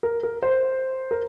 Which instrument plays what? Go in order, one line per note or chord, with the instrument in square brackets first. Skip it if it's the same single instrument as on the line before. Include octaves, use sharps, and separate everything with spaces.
[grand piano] A#4
A#4
C5
A#4